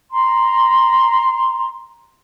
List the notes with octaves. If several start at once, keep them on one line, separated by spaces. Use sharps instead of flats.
A#5 C6